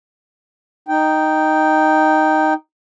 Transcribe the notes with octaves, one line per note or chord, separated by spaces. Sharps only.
D#4 G5